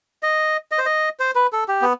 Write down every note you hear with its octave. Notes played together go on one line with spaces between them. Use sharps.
D#5
D#5
C5
D#5
C5
B4
A4
G4
B3